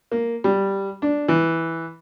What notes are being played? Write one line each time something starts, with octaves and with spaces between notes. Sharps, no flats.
A#3
G3
D4
E3